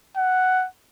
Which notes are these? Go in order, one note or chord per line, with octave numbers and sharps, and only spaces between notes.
F#5